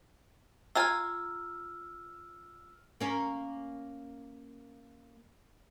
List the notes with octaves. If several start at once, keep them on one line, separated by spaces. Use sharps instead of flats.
F4 A#4 G#5 E6 F6
A#3 C#4 A#4